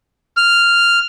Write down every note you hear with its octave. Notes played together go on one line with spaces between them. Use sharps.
F6